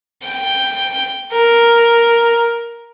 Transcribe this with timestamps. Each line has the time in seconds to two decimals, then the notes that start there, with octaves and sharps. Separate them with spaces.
0.23 G5
1.32 A#4